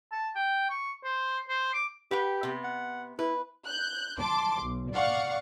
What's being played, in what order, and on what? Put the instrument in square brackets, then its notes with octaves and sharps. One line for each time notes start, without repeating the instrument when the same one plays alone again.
[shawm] A5
G5
C#6
C5
C5
D6
[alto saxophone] G4 [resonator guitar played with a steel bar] B4 F#5 G5
[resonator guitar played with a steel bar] C3 B3
[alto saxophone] F#5
[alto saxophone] E4 [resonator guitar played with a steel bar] B4
[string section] F#6 G6
A5 C6 D6
B1
D5 F5 F#5 C#6